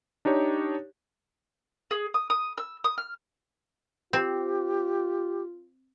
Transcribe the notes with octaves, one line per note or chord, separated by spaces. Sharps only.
D4 D#4 G4 C#5
G#4
D#6
D#6
E6
D#6
F6
C4 F4 G4